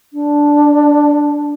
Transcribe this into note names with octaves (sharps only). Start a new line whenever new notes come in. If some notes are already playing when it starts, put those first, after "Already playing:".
D4